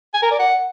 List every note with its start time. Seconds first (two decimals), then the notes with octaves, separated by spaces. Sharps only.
0.14 G#5
0.23 A#4
0.31 D5
0.40 F#5